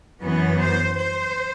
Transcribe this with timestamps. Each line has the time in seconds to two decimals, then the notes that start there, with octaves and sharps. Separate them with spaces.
0.21 F#2 E3 B3
0.59 C5
0.96 C5